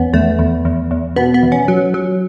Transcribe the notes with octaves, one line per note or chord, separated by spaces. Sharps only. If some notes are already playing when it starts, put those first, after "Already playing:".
Already playing: E2 B3 C#4
E2 A3
E2
E2
E2
B2 B3
B3
E2
C#4
F#3
F#3